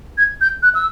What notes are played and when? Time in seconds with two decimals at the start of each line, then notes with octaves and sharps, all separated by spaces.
0.18 G#6
0.41 G6
0.63 F#6
0.75 E6